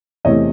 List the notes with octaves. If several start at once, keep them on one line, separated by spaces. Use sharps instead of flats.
E2 C3 E3 A3 C4 C#5 D#5